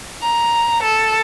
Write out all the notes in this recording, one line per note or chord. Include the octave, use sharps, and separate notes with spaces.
A#5
A4